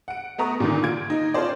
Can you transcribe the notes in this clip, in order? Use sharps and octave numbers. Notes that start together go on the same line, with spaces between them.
F#5 D7
A3 B3 A#5 C#6 D#6
A#2 D3 D#3
F4 G#6 D7
D#4
C#4 F4 A4 C5 D5